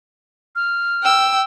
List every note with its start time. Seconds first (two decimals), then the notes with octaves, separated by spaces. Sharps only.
0.56 F6
1.03 G5 E6